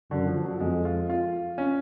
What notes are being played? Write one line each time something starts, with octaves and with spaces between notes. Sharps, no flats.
F#2 D3
F3
F#3
F2 G#3
F4
F4
C#4